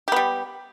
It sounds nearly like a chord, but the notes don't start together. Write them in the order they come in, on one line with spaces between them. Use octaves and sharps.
G4 B3 G3